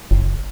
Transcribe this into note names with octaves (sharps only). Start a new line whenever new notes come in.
F#1